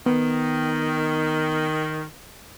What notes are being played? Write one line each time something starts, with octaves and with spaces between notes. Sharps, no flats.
D#3 B3